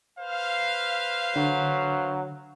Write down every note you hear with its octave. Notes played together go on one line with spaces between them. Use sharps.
B4 C5 F5
D3 F#3